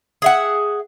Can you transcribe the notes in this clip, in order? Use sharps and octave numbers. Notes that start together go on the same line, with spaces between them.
G#4 E5 F#5